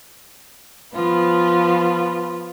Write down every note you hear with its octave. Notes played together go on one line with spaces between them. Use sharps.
F3 B3 F4